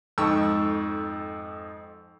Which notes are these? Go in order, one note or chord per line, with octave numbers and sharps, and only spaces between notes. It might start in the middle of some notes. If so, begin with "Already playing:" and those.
F2 G#2 A4 G5 C#6 E6